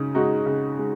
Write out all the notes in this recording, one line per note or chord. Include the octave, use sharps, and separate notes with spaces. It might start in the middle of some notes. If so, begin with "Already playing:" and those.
Already playing: C#3 G#3 D#4
G#3 D#4 F#4
C#3
G#3